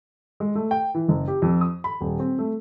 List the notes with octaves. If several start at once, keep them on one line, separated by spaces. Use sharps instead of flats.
G#3
A3
G5
E3
F#1
G4
F2
D#6
B5
D#1
C4
A3